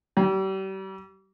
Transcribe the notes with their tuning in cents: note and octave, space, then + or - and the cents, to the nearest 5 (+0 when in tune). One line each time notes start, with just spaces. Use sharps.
G3 -35